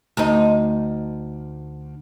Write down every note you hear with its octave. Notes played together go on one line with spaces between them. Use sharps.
D2 D#4